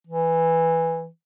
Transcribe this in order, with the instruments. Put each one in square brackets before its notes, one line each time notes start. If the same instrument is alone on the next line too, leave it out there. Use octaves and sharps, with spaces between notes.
[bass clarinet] E3